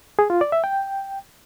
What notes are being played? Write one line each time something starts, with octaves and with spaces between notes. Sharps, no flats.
G#4
F4
D5
E5
G5